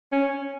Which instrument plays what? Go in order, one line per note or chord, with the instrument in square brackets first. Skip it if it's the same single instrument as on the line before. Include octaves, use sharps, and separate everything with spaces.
[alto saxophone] C#4